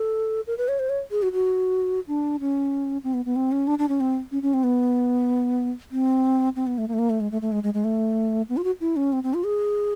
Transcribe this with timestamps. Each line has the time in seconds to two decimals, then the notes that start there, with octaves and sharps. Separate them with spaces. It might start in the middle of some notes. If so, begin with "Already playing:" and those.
Already playing: A4
0.47 A#4
0.58 B4
0.68 C#5
0.79 C5
0.89 C#5
1.11 G#4
1.23 F#4
1.33 F#4
2.08 D4
2.40 C#4
3.04 C4
3.14 B3
3.25 B3
3.36 C4
3.52 C#4
3.67 D4
3.79 D4
3.89 C#4
4.00 C4
4.32 C#4
4.42 C#4
4.54 C4
4.64 B3
5.91 C4
6.56 C4
6.67 B3
6.78 A3
6.88 A#3
6.93 A3
6.99 A#3
7.10 A3
7.20 G#3
7.32 A3
7.42 A3
7.52 G#3
7.63 G#3
7.74 G#3
7.84 A3
8.49 B3
8.57 F4
8.64 F#4
8.81 E4
8.96 C#4
9.13 C4
9.23 C4
9.34 F4
9.45 G#4